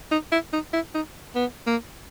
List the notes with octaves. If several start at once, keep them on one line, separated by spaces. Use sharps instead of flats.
D#4
E4
D#4
E4
D#4
B3
A#3